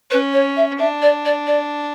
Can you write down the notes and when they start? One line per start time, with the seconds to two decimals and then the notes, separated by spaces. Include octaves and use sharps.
0.10 C#4 B4
0.33 C#5
0.56 E5
0.79 D4 E5
1.02 D5
1.25 D5
1.47 D5